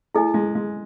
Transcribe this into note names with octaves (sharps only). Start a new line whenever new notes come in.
A3 E4 G#4 D#5 G#5
G#3
G#3